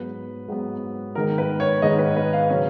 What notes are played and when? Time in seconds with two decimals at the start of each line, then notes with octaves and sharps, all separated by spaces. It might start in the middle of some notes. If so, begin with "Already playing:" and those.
Already playing: G#2 F#3 B3 B4
0.48 G#2 F#3 B3
1.15 G#2 D#3 G#3 A#4
1.38 B4
1.60 C#5
1.82 G#2 D#3 G#3 D#5
1.99 B4
2.16 B4
2.33 F5
2.50 C#3 F#3 C#4